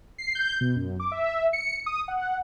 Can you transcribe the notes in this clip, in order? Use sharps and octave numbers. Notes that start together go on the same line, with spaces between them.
C7
G6
B2
F#2
D6
E5
C#7
D#6
F#5